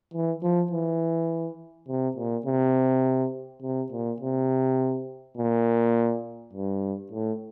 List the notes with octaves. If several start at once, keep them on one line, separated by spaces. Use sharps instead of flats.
E3
F3
E3
C3
A#2
C3
C3
A#2
C3
A#2
G2
A2